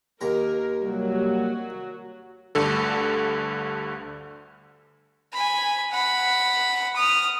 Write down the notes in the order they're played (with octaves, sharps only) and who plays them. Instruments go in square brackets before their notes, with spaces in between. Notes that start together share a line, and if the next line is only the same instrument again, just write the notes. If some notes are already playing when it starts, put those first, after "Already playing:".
[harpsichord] D#2 A#5 [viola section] A#4
[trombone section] C3 G3 A#3 [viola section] F#3 F#4
[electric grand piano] D2 G2 D3 A4
[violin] G#5 B5
F#5 B5
D#6 F6